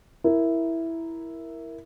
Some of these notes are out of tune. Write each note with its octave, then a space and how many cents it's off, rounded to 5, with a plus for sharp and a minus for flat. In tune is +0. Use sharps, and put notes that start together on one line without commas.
E4 +0 A#4 +0